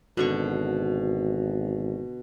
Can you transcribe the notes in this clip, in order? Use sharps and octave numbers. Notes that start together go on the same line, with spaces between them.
G#1 B2 D3 C#6